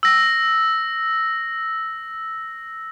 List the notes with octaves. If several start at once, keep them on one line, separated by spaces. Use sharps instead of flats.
E6 A#6